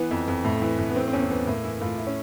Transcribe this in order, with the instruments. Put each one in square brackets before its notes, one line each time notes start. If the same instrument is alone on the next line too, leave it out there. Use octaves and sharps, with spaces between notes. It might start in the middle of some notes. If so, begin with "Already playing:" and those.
Already playing: [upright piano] E3 B3
F2
F2
A2
E3
A2
B3
E3 C4
C4
E2 C#4
C4
E2 B3
A2 A#3
E3 E4
A2 F4
E4
C#4